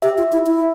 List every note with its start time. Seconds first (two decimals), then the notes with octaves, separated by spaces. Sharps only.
0.02 G4 E5
0.17 F4
0.32 E4
0.47 E4